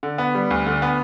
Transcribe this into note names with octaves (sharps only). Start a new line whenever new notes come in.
D3
B3
G3
D2
D3
B3